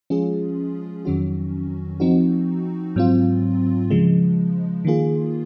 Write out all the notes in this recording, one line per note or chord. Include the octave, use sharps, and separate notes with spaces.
F3 G#3 C#4 F4 G#4
F2 D#3 F#3 C#4 F#4
F3 C4 D#4 F#4
G#2 F#3 C4 F4
C#3 F3 G#3
D#3 A#3 F4 G#4